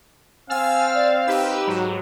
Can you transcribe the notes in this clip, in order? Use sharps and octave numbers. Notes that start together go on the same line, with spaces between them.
C4 F5 G#5 E6 F6 A6
D5
D#4 G4 B4 E6
G#2 F#3